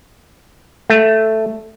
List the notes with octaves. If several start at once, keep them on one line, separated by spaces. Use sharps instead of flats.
A3